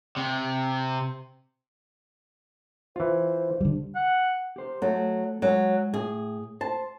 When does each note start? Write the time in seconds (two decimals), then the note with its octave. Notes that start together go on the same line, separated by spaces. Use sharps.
0.17 C3
2.96 E3 F4 C5
3.61 D3 G3
3.95 F#5
4.56 G4 C5
4.82 F#3 A3 A4
5.42 F#3 G#3
5.94 A2 G#4
6.61 C5 A5